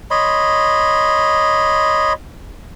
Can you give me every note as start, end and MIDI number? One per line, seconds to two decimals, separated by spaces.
0.11 2.13 73
0.11 2.13 75
0.11 2.13 83
0.11 2.13 84